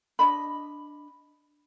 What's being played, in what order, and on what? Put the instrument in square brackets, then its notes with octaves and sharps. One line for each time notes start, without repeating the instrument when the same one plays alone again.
[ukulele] D4 D#5 B5